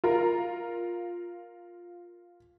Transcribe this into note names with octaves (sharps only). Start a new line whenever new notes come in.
F4 A#4